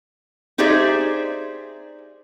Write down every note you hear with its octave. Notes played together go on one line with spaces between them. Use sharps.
D#4 G4 G#4 C5 D5 E5